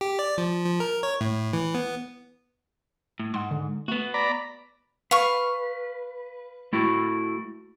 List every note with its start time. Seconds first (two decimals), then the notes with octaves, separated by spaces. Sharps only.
0.01 G4
0.19 D5
0.38 F3
0.65 F3
0.80 A#4
1.03 C#5
1.21 A2
1.53 E3
1.75 B3
3.20 A2
3.34 G#2 F#5 C6
3.51 D3
3.88 A3 B3 F#4
4.14 D5 A#5 B5
5.11 B4 F5 C#6
6.73 A3 E4 F#4